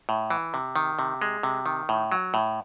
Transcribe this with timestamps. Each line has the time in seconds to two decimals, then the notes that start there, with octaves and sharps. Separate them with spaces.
0.09 A2
0.30 E3
0.54 C3
0.76 D#3
0.99 C3
1.22 G#3
1.43 C3
1.66 D#3
1.89 A2
2.12 F#3
2.34 A2